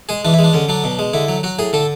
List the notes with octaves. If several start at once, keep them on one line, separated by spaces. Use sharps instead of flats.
G#3 G#4
E3 D4
E4
G#3
D4
D3 C#4
F#3 D4
B2
G#3
D3 E4
F#3
F#3 F#4
A2 G#4
D3 A4